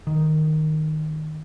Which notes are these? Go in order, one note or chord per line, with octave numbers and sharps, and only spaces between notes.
D#3